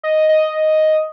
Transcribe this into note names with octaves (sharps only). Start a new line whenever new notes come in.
D#5
D#5